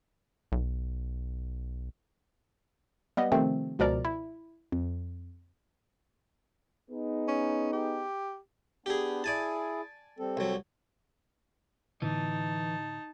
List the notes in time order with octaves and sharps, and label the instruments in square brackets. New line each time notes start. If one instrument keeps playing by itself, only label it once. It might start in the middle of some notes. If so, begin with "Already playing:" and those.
[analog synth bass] B1
[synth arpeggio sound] G3 B3 D#5
C3 D#3 F3 A3 C4
C#2 B2 F3 A#4 D5 A#5
E4
F2
[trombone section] B3 D#4 G#4
[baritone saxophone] C#4
G4
[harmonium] B3 D4 [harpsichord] G4 G#4
[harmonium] E4 G#4 [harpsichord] D5 G#5 A5
[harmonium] G3 C4 A4
[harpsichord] C2 F#3
[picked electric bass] A2 D3 B3 [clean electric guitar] E3 [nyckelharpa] D#4 A5